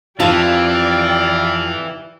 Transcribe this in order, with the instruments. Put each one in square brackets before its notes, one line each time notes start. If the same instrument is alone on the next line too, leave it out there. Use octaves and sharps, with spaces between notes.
[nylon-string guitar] F2 F4 A5 [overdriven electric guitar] E3 [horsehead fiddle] G4 D5 [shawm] F5